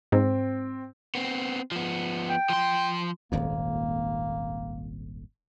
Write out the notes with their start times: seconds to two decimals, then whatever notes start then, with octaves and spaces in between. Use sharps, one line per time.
0.12 G#2 C4
1.15 B3 C4
1.72 F3 B3
2.29 G5
2.50 F3 C6
3.32 D#1 G#1 F2 A#3